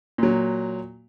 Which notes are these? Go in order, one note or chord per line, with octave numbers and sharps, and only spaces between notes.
A#2 F#3